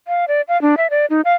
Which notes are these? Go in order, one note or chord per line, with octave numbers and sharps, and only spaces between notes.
F5
D5
F5
D4
E5
D5
D#4
F5